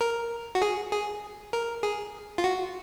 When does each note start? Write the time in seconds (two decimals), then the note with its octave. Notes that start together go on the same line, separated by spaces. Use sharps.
0.01 A#4
0.55 F#4
0.62 G#4
0.92 G#4
1.53 A#4
1.83 G#4
2.38 F4
2.44 F#4